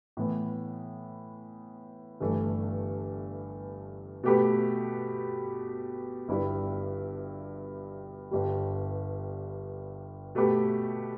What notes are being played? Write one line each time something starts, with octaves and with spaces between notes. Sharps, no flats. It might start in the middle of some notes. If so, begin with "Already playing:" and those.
A2 E3 B3
G1 G2 E3 A3
B2 A3 G4 B4
G1 G2 G3 E4 B4
G1 G2 G3
B2 A3 G4 B4